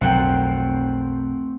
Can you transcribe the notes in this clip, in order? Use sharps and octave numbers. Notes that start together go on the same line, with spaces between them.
B1 F2 F#3 A3 C4 A#4 F#5 G5